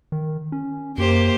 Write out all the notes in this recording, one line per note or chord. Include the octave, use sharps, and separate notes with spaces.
D#3
C#4
F#2 A#3 G4 C5